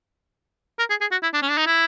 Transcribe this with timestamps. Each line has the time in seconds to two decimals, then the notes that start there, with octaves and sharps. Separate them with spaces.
0.79 A#4
0.90 G#4
1.01 G#4
1.11 F#4
1.23 E4
1.33 D4
1.42 C#4
1.49 D4
1.58 D#4
1.66 E4